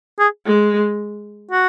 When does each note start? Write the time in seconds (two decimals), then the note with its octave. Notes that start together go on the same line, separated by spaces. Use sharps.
0.20 G#4
0.46 G#3
1.51 F#4